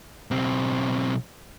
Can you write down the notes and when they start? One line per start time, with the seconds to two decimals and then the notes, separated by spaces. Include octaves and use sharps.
0.31 B1 C4